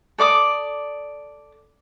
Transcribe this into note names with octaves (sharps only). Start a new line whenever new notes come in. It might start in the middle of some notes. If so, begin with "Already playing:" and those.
A4 D5 D6 D#6